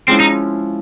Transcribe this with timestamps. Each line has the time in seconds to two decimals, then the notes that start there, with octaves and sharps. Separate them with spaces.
0.08 F3 G#3 C4 C#4 E4
0.20 D#4